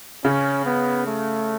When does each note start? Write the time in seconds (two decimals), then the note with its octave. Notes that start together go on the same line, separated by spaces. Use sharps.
0.25 C#3 C#4
0.66 B3
1.06 A3